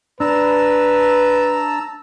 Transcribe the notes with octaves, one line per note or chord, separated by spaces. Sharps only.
D4 B4 A5 A#5 E6